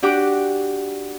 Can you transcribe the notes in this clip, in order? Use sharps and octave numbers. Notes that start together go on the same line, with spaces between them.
D4 F#4 G4 D6